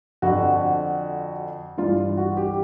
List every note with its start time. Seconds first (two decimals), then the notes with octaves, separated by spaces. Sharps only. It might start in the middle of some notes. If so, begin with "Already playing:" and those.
0.22 F2 D3 F3 F#4
1.77 G2 E3 F4
2.17 F#4
2.37 G4